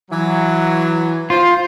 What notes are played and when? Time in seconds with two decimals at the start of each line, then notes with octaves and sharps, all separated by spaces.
0.11 E3 F#3
1.30 F4 C5